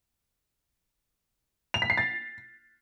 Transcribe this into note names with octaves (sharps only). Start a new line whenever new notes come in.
F7
B6
C7
A6